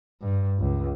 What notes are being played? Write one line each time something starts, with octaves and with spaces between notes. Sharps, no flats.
G2
C#2